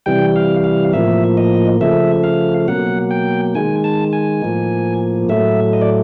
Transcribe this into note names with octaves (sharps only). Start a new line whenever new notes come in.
C3 E3 G3 G5
F5
F5
A2 F3 A#3 E5
D#5
C#3 F3 A3 E5
F5
B2 F#3 A#3 F#5
G5
D#3 G#3 G#5
A5
G#5
A2 F3 A#3
A2 F#3 A3 E5
D#5
D5